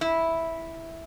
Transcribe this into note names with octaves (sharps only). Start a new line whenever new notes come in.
E4